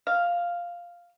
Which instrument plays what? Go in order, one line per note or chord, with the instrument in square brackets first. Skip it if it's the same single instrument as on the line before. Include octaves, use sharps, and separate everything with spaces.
[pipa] F5